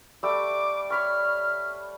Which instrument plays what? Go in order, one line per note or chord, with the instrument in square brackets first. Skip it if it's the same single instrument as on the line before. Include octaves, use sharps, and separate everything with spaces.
[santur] G3 A3 E6 [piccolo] D6
[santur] C#5 B5 C#6 [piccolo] F6